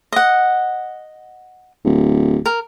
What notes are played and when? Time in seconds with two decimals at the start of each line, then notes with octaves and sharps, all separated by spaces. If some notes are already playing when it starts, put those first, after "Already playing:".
0.12 D#5 F#5
1.85 D1
2.46 A#4